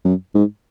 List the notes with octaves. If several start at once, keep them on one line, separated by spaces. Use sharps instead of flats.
F#2
G#2